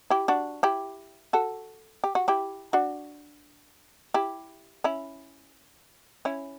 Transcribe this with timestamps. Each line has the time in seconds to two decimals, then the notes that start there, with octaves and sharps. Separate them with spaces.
0.10 E4 G4
0.28 D4 F#4
0.63 E4 G4
1.33 F#4 A4
2.04 G4
2.15 F#4
2.28 E4 G4
2.73 D4 F#4
4.14 E4 G4
4.84 C#4 E4
6.25 C#4 E4